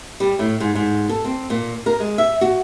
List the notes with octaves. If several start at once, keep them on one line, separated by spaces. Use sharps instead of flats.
G3
A2
G#2
G#2
A4
C4
A#2
A#4
G#3
E5
F#4